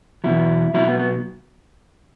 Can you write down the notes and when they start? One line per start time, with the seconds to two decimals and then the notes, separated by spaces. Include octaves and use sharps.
0.24 E2 B2 F#3 E4
0.74 B2 F#3 E4
0.88 B3
0.99 B3